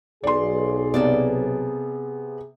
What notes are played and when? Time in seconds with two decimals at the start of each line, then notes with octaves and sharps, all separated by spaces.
0.24 B1 G#4 D5 C6
0.94 C3 A#3 B3 A4 D5